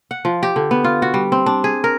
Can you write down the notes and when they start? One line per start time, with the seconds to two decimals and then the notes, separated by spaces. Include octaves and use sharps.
0.11 F#5
0.25 F3
0.43 G4
0.56 D3
0.71 B3
0.84 F4
1.02 F#4
1.14 G3
1.32 C4
1.46 D4
1.64 G#4
1.84 A#4